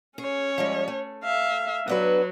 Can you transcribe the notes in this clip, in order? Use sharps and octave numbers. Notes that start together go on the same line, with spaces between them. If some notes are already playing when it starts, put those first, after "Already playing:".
C#4 G#4 C#5
F3 G3 G#3
A3
E5 F5
F#3 B3 D4 B4